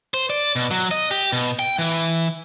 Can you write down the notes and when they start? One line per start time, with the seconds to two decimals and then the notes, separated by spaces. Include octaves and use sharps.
0.14 C5
0.30 D5
0.56 B2
0.71 F#3
0.91 D#5
1.11 G4
1.33 B2
1.59 G5
1.79 E3